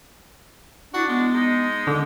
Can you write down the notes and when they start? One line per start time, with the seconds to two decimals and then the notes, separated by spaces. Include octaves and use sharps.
0.94 D4 E4 F#4
1.09 G#3 B3
1.34 G#3 D#4
1.87 D3 D4